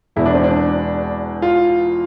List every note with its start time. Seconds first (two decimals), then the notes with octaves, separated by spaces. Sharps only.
0.16 E1 E2 B2 E4
0.26 D4
0.35 C4
0.44 D4
1.42 F4